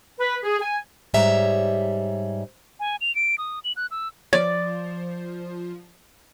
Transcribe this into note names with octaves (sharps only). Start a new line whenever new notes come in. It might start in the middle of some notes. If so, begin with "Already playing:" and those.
B4
G#4
G#5
G#2 G3 C#5 E5 A#5
G#5
F7
D7
D#6
F#7
F#6
E6
F3 C#5 D5